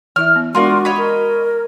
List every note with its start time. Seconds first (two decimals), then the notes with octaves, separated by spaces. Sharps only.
0.16 E3 E4 E5 F6
0.36 B3
0.55 G#3 B3 D4 F4 F#4 A#4 D5
0.85 C#5 D#5 B5
0.97 A#4